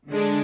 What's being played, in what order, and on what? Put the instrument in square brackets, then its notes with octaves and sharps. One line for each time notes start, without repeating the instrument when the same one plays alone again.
[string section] D3 G#3 D4